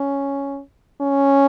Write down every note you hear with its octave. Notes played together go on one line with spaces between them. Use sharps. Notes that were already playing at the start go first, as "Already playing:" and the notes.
Already playing: C#4
C#4